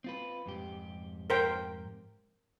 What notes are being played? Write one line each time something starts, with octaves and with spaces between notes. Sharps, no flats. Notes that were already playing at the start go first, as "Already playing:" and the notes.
C4 F4 B4
F2 G#2 G4
A#4 C5 G5